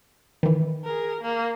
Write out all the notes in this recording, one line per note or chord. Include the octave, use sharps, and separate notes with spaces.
D#3 E3
G#4 A#4
A#3